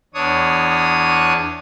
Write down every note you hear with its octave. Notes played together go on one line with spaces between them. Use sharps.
E2 D4 C#5 D#6